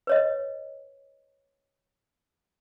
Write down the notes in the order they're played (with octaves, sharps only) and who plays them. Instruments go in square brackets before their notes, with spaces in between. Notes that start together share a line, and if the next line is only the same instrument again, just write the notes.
[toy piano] B4 C#5 D#5